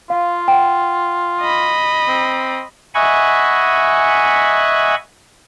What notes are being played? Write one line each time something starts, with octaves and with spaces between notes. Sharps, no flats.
F4 F5
F#5 G5
D#5 B5
C4
D#5 E5 F#5 G#5 B5 C#6